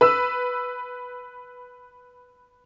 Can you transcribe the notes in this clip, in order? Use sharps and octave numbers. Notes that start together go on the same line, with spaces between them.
B4 E6